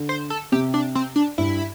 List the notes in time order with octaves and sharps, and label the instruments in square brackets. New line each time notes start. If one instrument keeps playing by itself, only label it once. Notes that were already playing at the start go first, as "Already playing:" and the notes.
Already playing: [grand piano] D3
[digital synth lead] C5
A4
[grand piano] C3 [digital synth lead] G4
[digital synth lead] D4
C4
D4
[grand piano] G2 [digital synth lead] E4